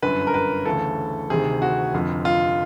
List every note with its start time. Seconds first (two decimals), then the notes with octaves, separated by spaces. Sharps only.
0.02 G1 F#2 D3 B4
0.27 A#4
0.34 B4
0.65 D2 C#3 E3 A4
1.30 D2 C3 D#3 G#4
1.62 F#4
1.94 F1 F2 D3
2.25 F4